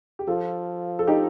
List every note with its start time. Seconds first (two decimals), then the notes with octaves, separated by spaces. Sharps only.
0.19 G4
0.27 F3 F4 A4
0.99 A4
1.07 D#4 G4